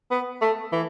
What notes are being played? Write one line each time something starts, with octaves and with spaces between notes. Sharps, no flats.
B3
A3
E3